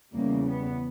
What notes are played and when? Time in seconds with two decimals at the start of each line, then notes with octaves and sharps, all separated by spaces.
0.13 E2 C#3 G3 A#3
0.47 B3